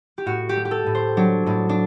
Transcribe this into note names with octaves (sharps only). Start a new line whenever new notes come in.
G4
A2 F#4
G4
A3
G4
A4
A2
C5
F#3 D4
A2 D4
D4